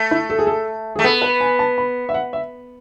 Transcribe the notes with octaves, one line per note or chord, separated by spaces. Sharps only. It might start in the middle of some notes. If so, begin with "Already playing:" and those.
Already playing: A3
E4
A4
G#4
A4
A3 G#4
B3 A4
B4
G#5
A5
B5
E5
F#5
E5